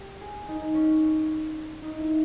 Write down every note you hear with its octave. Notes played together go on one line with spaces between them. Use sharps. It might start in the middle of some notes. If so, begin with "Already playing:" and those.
Already playing: G4
G#4
D#4
C#4
D#4
E4